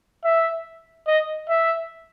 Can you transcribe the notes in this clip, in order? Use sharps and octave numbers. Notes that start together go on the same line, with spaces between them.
E5
D#5
E5